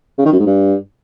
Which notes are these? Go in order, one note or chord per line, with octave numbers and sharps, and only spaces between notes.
C#3
D#3
F#2
G#2
G2